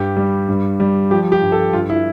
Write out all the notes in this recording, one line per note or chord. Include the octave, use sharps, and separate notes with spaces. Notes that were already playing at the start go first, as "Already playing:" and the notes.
Already playing: G2 G4
G3
G2
G3
F3 G4
G4
G2
A4
G2 F4
E4